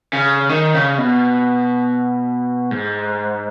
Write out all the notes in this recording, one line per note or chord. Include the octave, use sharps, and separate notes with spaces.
C#3
D#3
C#3
B2
G#2